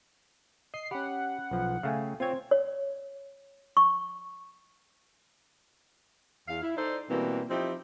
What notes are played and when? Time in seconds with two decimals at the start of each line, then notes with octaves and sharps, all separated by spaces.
0.74 D#5 C7
0.91 C#4 G4 F#5 B5
1.51 B1 F3
1.83 C#3 A3 F5 G5 G#5
2.20 C4 F4 C5 C#5 G#6
2.51 C#5
3.77 C#6
6.48 E2 F5
6.62 E4
6.77 D#4 A4 C5 D5
7.09 B2 E3 G3 A#3 C4
7.50 F3 C4 D#4 E4 G4